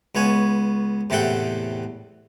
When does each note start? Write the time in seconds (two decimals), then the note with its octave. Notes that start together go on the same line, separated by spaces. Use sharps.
0.15 C#2 B3 C#5 G#5
1.10 E2 A2 C3 A4 F#5 G5